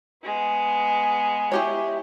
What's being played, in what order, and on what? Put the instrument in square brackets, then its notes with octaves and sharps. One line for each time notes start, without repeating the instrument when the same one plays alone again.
[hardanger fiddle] G#3 B3
[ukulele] E4 G4 C#5